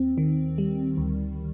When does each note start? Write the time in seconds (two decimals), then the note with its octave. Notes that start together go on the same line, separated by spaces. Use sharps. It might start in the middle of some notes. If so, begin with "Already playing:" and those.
Already playing: D#2 C4
0.18 D#3
0.58 G3
0.97 D2